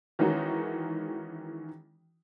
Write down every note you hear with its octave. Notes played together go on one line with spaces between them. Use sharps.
D#3 E3 G#3 C#4 D#4 F#4